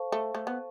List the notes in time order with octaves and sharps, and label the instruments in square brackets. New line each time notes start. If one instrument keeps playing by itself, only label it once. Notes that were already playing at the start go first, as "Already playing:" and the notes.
Already playing: [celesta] A4 C5 F5 A5 C#6
[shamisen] A3
A3
B3